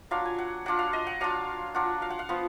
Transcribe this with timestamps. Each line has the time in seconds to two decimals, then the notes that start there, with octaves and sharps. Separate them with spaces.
0.11 F#3 D4 F4 F5
0.25 G#5
0.38 F#5
0.66 F#3 D4 F4 F#5
0.79 F5
0.93 D#5
1.07 F#5
1.20 F#3 D4 F4 F5
1.74 F#3 D4 F4 F#5
2.02 F5
2.10 F#5
2.19 F5
2.29 F3 B3 F4 F#5